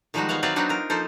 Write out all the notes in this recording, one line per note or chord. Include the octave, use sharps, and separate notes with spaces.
D#3 F3 G3 G#3 D#4 F#4
B3 C#5 F5 F#5
F#3 C4 B4 D5 E5 F5
F#3 B3 C4 D4 D#4 F#4
F4 A#4
F3 A#3 D#4 A4 C5